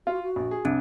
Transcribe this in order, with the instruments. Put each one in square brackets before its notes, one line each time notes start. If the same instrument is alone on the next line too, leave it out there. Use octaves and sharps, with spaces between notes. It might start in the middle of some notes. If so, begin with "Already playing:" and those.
[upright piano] F4 [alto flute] F#4
[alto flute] F#4
[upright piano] A#1
G#4
[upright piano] C2 [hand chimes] C4 D4